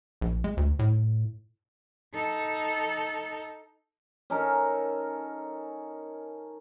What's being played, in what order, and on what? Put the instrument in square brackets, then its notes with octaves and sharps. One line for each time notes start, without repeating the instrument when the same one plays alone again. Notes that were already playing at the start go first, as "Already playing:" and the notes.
[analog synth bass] A#1
G#3
D2
A2
[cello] D#4 A4
[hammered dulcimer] C#4 D#4 A4 A#4